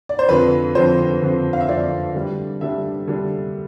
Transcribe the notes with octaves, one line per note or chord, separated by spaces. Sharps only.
D5
C5
F2 D3 F3 C4 B4
F2 D3 F3 C4 C5
F2 D3 F3 C4
F5
E5
F2 D3 F3 C4 D5
D3 G3 D4
D3 G3 D4 E5
D3 G3 D4